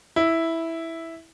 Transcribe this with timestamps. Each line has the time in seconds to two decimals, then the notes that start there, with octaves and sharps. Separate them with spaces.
0.16 E4